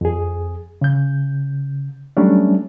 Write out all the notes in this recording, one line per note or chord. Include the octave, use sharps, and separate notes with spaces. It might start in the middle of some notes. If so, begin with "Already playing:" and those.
F2 G#4
C#3 G6
F#3 G3 A3 C#4 D4